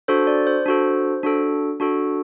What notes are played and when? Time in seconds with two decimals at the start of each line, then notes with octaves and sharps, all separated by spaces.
0.08 D4 F#4 A4 C5
0.27 D5
0.47 C5
0.66 D4 F#4 A4
1.23 D4 F#4 A4
1.80 D4 F#4 A4